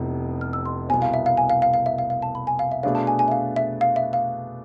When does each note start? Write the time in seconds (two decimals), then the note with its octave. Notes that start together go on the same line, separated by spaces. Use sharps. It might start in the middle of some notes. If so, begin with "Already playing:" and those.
Already playing: F1 F2 C3 E3 B3
0.41 F6
0.53 E6
0.66 C6
0.89 C2 B2 B3 G#5
1.02 F5
1.14 E5
1.26 F5
1.37 G#5
1.50 F5
1.62 F5
1.74 F5
1.86 E5
1.98 F5
2.10 F5
2.22 A5
2.35 B5
2.47 G#5
2.59 F5
2.72 E5
2.83 B2 A3 D4 G#4 B4 F5
2.95 A5
3.07 G#5
3.19 G#5
3.28 E5
3.32 F5
3.56 E5
3.81 F5
3.96 E5
4.13 F5